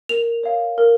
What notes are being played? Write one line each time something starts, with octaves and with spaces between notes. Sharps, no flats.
A#4 F7
C#5 F5
A#4